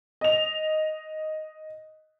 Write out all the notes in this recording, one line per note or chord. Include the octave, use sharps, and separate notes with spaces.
D#5 F7